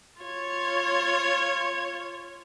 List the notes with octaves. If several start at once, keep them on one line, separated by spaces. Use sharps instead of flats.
F4 C#5